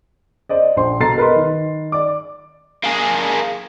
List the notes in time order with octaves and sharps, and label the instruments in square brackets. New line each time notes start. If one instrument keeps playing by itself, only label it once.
[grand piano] C5 D5 D#5
A#1 C5 C6
B2 A4 A#5 A6 C7
A#4 B4 D#5 C6
D#3
D5 D6
[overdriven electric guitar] A#3 G#4